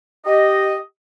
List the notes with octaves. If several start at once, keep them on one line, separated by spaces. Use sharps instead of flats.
G4 D#5